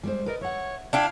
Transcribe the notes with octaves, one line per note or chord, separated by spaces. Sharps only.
G3 G#3 C5
A#4 B4 D5 D#5
C#5 E5 F#5
D4 E4 F5 G5